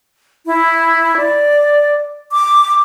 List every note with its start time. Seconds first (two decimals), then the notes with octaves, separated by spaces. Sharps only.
0.46 E4
1.17 D5
2.32 D6